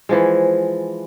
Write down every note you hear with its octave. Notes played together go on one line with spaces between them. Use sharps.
E3 F3 G#3